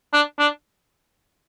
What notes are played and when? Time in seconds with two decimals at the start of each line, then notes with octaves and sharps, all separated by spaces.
0.13 D4
0.39 D4